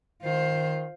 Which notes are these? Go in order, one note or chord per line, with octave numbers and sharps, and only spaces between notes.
D#3 F4 C5